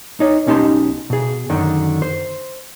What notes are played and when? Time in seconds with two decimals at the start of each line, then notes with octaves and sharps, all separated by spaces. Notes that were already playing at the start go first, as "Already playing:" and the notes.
0.20 D#4 C#5
0.47 B1 C#4 D#4 G4 A5 C6
1.10 B2 G#4
1.50 F#2 D3 D#3
2.02 C5